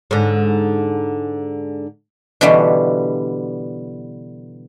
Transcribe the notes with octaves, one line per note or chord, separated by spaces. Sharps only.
G#2 D3
B2 D3 E3 G3